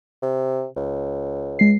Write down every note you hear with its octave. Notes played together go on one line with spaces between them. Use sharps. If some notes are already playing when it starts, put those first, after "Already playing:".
C3
C#2
G#3 C7